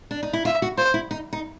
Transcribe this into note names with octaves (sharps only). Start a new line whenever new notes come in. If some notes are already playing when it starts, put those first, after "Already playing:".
D4
D#4
E4
F4 E5
F#4
F4 C5
E4
D#4
D#4